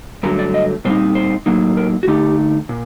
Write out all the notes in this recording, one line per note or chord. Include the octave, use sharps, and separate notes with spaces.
G2 D3 F#3 A3 A#4
D5
D#5
A#2 G3 C4 D#4 C5
C5
A2 F#3 A#3 D#4
A#4
F#4
D3 A3 D#4 G4
A#2